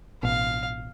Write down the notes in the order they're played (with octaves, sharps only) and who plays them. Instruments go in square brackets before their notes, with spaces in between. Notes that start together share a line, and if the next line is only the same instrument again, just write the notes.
[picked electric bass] A1 B2 [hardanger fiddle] F5